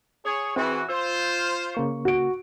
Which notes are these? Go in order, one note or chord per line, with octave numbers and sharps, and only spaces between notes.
G#4 C#5
E3 C4 F#4 G#4 C5
F4 C5 E6
F6
C#3 A#3 C#6
F#4 D7